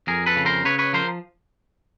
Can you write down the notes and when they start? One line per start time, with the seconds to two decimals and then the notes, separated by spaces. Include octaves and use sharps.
0.07 F2 G#4 A#4
0.26 A4 B4
0.36 C#3
0.46 A#4 C5
0.65 C#3 B4 C#5
0.79 B4 C#5
0.93 F3 A#4 C5